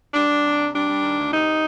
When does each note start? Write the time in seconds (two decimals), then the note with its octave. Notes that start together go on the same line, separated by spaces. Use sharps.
0.14 G3 D4
0.29 G3
0.44 C3
0.59 C3
0.73 G3 D4
0.89 G3
1.03 D#3
1.18 D2
1.32 C3 D#4